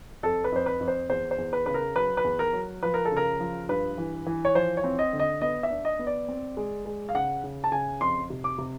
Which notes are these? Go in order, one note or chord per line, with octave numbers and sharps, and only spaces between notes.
F2 A4
B4
F2 C5
B4
F2
C5
E2 C5
C5
E2
B4
C#3 B4
A#4
F#3 B4
B4
E2
A#4
F#3
F3 B4
A#4
A4
C#3
A#4
F3
G2 B4
E3
E3
C#5
F3 C5
C#5
C4
D#5
D3
D#5
B3 D#5
E5
D4
D#5
B3
D5
C4
G#3
G#3
F5
C#3 F#5
C#3
A5
C#3 G#5
F2 C6
C3
D6
C3